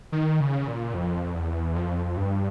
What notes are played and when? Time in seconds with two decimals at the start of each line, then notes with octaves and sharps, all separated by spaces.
0.12 D#3
0.40 C#3
0.67 A#2
0.94 F2
1.35 E2
1.76 F2
2.17 G2